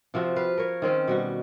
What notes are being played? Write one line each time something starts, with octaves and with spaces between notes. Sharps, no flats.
C3 F3 C4 F#4
B4 F5
A#4 C#5
D#3 C4 C#4
B2 G3 F#4